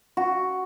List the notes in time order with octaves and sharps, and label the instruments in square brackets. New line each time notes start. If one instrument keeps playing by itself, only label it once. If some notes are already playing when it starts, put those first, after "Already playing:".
[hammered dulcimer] F#4